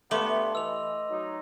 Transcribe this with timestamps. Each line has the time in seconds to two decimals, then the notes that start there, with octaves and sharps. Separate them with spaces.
0.11 G2 A3 B3 C6 D6 F#7
0.55 E3 D#5 E6 F7
1.10 F#3 D#4